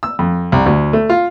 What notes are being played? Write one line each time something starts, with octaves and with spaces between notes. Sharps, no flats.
E6
F2
C2
D2
A3
F4